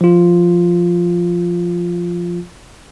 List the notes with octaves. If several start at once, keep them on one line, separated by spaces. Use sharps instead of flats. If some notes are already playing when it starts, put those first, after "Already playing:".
F3 F4